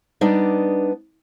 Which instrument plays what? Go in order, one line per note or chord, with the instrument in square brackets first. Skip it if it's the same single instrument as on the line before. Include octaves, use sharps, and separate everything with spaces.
[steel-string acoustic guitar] G3 B3 D4 D#4 D5